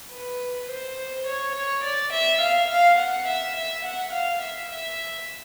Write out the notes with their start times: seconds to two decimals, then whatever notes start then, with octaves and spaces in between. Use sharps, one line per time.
0.12 B4
0.69 C5
1.26 C#5
1.55 C#5
1.84 D5
2.12 E5
2.41 F5
2.70 F5
2.98 F#5
3.27 E5
3.56 E5
3.84 F#5
4.13 F5
4.42 E5
4.70 E5